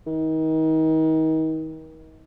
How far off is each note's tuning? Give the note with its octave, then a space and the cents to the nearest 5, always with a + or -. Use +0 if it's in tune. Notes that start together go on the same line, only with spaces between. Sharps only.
D#3 +35